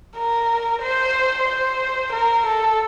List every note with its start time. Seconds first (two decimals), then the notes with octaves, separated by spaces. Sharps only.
0.17 A#4
0.82 C5
1.48 C5
2.13 A#4
2.47 A4